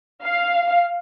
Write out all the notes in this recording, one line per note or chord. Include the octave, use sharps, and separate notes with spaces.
F5